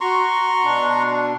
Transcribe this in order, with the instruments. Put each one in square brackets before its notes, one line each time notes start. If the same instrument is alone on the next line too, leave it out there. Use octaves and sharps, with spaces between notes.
[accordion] F#4 [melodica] A#5 C6 C#6
[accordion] B2 D4